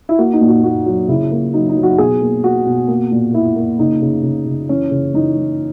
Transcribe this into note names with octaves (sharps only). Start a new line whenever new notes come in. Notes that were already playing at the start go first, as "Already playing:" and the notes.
E4
A#3 F#4
D#4
A#2
F#4
A#3 F#4
F#3
C#3 E4
A#3
F#3 D#4
D#4
F#3
F#4
B2 G#4
A#3
A#3 F#4
B2
A#3
A#2
A#3 E4
A#3
C#3 D#4
C#3
C#3
C#3
E3 C#4
C#3
E3 D#4
E3